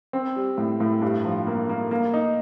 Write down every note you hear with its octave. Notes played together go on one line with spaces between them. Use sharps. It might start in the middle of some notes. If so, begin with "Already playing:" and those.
C4
G3
A2
A2
G2
F3
A#3
A#3
A#3
D#4